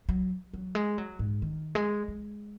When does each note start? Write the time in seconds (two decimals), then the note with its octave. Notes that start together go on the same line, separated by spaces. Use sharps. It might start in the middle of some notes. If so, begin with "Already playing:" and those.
0.09 F#3
0.54 F#3
0.75 G#3
0.98 F#3
1.19 G#2
1.42 D#3
1.75 G#3
2.08 G#3